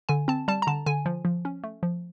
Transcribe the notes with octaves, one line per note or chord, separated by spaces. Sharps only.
D3 G#5
C4 A5
G3 A5
A#5
D3 A5
D3 G#5
F3
F3
C#4
A3
F3